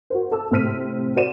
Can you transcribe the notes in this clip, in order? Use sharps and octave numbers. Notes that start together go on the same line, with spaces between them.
F#4 A#4 C5
A4 A5 E6
A2 C3 C4 F6 B6 D#7
F#4 C5 D5 D#7 E7